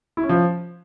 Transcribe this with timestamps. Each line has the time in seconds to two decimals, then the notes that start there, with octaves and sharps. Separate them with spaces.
0.17 E4
0.23 C#4
0.29 F3